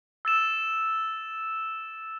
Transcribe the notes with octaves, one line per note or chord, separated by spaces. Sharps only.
E6 A6 E7